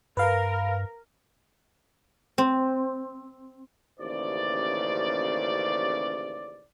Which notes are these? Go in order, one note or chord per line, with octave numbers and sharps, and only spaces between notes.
G2 A#4 B4 F5
C4
A1 D#2 C#3 C5 D5